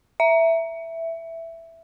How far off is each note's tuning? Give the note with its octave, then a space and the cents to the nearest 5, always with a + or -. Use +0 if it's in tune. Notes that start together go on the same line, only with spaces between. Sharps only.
E5 +5